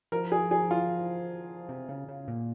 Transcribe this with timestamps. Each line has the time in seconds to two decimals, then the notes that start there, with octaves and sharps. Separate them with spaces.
0.12 F3 A#4
0.32 G#4
0.51 G#4
0.71 F4
1.69 C3
1.89 C#3
2.08 C#3
2.28 A#2